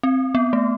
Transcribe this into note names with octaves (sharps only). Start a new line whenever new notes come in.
C4
B3
A3